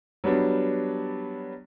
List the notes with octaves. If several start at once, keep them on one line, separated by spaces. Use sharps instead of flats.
F#3 G3 B3 D4